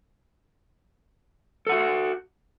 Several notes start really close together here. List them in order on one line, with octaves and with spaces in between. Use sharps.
A4 F#5 F#4